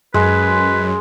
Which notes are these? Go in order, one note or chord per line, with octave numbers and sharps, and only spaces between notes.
F#2 G#3 B4